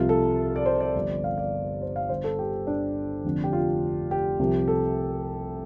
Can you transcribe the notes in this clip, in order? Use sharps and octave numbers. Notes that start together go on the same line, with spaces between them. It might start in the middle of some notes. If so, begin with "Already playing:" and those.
Already playing: C2 C3 F3 F4
A4
D5
C5
D5
G1 G2 F3
F5
D5
C5
F5
G1 G2 D3 C5
A4
G4
D4
F1 F2 D3
G4
F4
G4
C2 C3 F3
A4